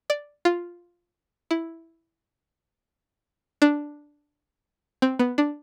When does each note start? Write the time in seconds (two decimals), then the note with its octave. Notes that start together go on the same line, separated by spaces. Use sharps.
0.10 D5
0.45 F4
1.51 E4
3.62 D4
5.02 C4
5.19 B3
5.38 D4